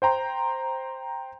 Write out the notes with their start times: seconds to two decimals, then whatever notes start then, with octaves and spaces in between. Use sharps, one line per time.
0.02 C5 G5 A#5 C6